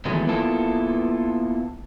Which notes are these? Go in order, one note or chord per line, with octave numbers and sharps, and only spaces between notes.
D#3 E3 F#3 G#3 A3 B3
A#3 B3 E4 F4 A4